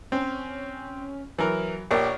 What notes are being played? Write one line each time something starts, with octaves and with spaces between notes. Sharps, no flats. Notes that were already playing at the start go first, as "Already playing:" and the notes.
C4 C#4
E3 F#3 A#4
A#1 G4 A#4 C#5 D5